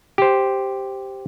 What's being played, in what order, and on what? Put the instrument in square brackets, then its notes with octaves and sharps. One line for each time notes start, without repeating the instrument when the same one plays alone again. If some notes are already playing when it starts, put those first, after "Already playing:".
[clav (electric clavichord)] G4 C5